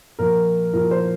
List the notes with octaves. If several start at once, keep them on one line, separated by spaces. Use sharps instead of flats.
A#2 F3 A#4
A#2 F3 A#4
C5